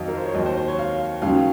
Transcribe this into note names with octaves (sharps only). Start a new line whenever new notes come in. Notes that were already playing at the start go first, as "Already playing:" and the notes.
Already playing: F2 D#3 F#3 D#5 F5
A#4
C5
C#5
D#2 D#3 F#3 D#5
C5
C5
C#5
F5
D#2 C#3 F#3 F5